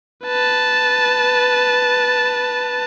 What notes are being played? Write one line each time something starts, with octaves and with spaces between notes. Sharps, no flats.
B4 A5